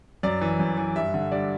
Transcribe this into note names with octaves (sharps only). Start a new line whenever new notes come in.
F#2 D5
E3
F#2
E3
G2 E5
D3
G2 D5